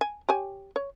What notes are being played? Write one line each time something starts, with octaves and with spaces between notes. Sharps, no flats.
G#5
G4 C#5 G#5
C#5